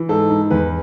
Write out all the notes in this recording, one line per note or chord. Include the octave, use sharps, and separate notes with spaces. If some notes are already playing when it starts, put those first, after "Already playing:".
Already playing: E3
G#2 A4
G#2
E2 B4